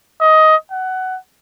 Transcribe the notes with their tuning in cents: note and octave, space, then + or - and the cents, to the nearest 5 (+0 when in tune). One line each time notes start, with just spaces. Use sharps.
D#5 +15
F#5 +15